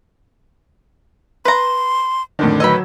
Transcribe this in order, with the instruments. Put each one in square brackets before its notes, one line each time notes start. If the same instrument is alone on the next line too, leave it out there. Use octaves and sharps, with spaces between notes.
[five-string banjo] B4 A#5 [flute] C6
[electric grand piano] F2 D4 [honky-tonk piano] A2 D3 D#3
[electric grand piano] F#3 E6 G#6 [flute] B4 [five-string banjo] D#5 B5